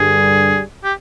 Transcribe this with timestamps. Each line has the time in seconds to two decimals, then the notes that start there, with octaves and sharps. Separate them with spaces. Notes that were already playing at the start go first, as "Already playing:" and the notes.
Already playing: G2 D3 G3 G#4
0.84 G4